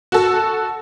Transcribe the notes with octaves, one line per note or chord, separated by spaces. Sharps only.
F#4 A4